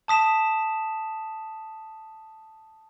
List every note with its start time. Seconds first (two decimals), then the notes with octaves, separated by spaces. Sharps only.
0.08 A5 D#6 B6 E7